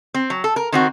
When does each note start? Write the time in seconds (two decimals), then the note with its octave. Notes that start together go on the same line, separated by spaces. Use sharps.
0.14 C4
0.30 F#3
0.44 A4
0.56 A#4
0.72 D#3 C4 F#4